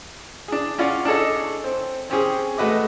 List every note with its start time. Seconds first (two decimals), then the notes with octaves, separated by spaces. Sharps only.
0.48 D4 G#4
0.78 C#4 F4 D5 F#5
1.05 D4 G#4 A4 C#5 D#5
1.64 C4
2.10 C4 C#4 G4 G#4
2.58 G#3 A3 F#4 B4 D#5 D6